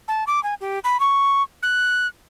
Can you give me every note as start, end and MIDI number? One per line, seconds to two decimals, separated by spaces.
0.08 0.24 81
0.27 0.42 86
0.43 0.54 80
0.61 0.79 67
0.84 1.00 83
1.00 1.43 85
1.63 2.07 90